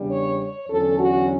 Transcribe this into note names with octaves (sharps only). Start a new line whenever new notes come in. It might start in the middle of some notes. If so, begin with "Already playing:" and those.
Already playing: E2 C#3 G3 B3 D4
C#5
C#5
E2 D3 F#3 C#4 A4
F#4